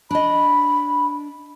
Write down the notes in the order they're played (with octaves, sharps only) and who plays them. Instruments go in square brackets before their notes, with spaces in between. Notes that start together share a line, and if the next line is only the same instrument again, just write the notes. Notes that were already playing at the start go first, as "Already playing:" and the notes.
[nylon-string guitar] D4 D#5 [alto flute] B5